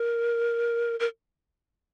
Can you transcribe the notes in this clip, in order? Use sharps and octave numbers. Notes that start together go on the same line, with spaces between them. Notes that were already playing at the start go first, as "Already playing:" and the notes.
Already playing: A#4
A#4